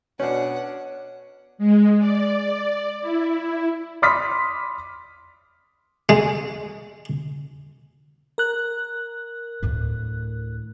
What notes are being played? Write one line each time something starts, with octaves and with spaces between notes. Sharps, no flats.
B2 C#4 D4 C#5 F#5
G#3
D5
E4
B5 C6 D6 D#6 F6 B6
G#3
A#4 F#6
D2 A2